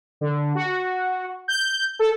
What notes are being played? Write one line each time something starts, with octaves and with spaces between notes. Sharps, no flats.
D3
F#4
G6
A4